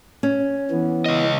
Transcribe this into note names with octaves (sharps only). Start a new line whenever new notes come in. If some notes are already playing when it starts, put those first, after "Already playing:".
C#4
E3 B3
C#2 D#5